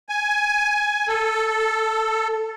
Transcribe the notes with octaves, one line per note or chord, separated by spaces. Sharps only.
G#5
A4